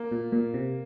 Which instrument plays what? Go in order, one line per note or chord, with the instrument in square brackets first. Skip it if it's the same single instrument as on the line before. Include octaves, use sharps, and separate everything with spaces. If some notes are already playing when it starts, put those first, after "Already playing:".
Already playing: [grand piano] A#3
[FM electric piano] A#2
A#2
C3